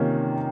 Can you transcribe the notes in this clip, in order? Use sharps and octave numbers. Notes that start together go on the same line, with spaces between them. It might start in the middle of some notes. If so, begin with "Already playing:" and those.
Already playing: C3 D#3 A#3 C#4 F4